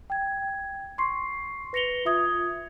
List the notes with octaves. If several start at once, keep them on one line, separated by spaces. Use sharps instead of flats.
G5 G#6
C6 C#6 C7
B4 A#6 C#7 F7 G7
F4 E5 D#6 G#6